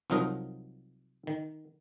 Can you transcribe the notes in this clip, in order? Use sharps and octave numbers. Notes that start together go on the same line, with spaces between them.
C2 F3 F#3 D#4 A#4 D#5
D#3